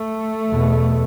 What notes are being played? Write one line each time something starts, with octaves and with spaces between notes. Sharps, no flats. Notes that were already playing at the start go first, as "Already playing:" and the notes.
Already playing: A3
E2 B2